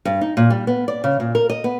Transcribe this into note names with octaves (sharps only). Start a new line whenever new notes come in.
G2
D#4
A#2
G3
B3
D5
C#3
A#2
A#4
D#5
B3